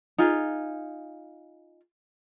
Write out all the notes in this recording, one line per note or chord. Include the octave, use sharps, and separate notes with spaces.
D#4 F4 G#4